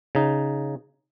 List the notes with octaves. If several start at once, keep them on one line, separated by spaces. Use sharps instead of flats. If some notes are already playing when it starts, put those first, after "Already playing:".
C#3 D#4